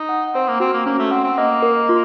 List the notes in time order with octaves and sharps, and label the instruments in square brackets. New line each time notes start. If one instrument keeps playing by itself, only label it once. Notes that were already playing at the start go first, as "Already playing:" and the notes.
Already playing: [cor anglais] D#4
[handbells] F#5
[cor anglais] C4 [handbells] C5
[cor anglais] A#3
[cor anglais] C4 [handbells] F#4
[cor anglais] A#3
[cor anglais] A#3 [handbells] C#4
[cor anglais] A3
[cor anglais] C4 [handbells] F#5
[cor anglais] C4
[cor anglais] A#3 [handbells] D#5
[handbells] A#4
F4